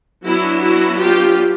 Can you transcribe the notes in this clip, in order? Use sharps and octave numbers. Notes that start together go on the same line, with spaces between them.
F#3 B3 D4 E4 F#4
E4 F#4
F4 G4